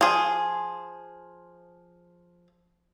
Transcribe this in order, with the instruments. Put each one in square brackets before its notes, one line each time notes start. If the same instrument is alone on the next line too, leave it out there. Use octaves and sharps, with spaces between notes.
[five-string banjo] F3 G#4